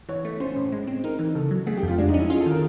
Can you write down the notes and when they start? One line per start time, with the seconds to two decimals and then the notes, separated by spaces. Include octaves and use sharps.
0.09 E3 C#5
0.25 A3
0.40 C#4 C5
0.56 A2
0.72 G#3
0.88 C4
1.04 D#4 A#4
1.19 E3
1.35 C#3 A4
1.51 F#3
1.66 A3 G#4
1.77 G4
1.83 F2
1.88 F4
1.98 G#3 D4
2.09 D#4
2.14 C#4
2.19 E4
2.30 F4 G#4
2.41 A4
2.46 D#3
2.51 A#4